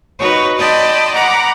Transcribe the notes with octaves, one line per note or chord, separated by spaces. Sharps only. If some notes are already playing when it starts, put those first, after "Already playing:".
D#4 F#4 B4 C#5
D5 D#5 G5 A5 B5 C6
F#5 A#5 B5 D6